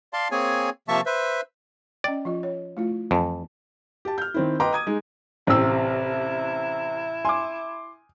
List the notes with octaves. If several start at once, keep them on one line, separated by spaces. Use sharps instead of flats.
D5 F5 A5 C6
A#3 C4 G#4 C#5 G#5
C3 F3 A#3 E5 A5 C#6
B4 C5 E5
C#4 D5 D#5 G5
F3 F4 D#5
C#5
A3 E4 F4
F2 E3 G#5 A5
G4 A5
F6 G6
D#3 C4 E4
B4 D#5 G5 A#5 C6 D6
D#6 G#6 D#7
G#3 D#4
A1 C3 C4 E4 E6
G#5 C6 D6